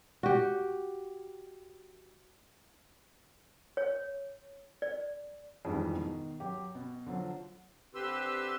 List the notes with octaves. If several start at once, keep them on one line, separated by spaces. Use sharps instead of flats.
F#4 G4
C#5
D5
F2 G#2 D#3 E3 G3 G#3
B2 D#3
F#3 G4
B2
D3 F3 F#3
D3 C4 G4 B4 C6 E6